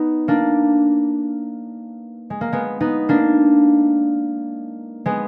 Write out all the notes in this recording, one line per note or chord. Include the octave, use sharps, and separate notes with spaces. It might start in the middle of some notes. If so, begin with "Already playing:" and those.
Already playing: B3 D#4
A#3 D4
G#3
A#3
G#3 B3
B3 D#4
A#3 D4
G#3 B3